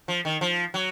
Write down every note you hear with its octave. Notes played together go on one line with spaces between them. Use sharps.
F3
D#3
F3
F#3